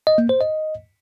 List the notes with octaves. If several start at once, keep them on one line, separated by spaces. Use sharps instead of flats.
D#5
A#3
C5
D#5